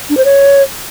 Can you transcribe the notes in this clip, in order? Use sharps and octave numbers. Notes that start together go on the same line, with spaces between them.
D4
C5
C#5